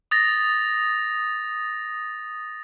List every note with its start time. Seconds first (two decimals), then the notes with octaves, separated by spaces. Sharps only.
0.11 D#6 A6 A#6